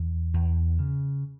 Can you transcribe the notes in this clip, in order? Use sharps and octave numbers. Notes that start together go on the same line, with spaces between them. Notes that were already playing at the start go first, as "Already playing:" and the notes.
Already playing: E2
E2
C#3